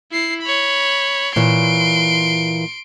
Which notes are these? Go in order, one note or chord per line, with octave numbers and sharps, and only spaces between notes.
E4 C7
C#5 B5
A#2 E3 C#5 C6 D7